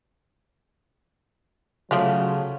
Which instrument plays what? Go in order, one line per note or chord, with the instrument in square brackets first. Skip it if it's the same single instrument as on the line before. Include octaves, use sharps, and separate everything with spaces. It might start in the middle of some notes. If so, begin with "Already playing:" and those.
[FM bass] C#3 [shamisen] F3 A3 F4 [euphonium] F#3